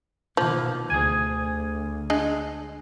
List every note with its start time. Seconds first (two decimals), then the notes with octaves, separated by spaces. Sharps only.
0.37 B2 D#3 F3 A#3
0.90 D2 G#4 G#5
2.10 G#3 D4 D#5